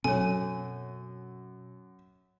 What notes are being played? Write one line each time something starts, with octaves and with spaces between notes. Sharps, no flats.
F#2 B2 C4 A4 C#5 G#5